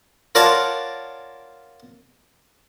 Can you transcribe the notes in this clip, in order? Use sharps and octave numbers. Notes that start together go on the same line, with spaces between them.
F4 A#4 C#5 D5 F#5 A5